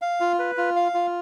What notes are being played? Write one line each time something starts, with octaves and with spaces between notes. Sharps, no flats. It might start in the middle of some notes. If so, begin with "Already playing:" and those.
F5
F4
B4
F4
F5
F4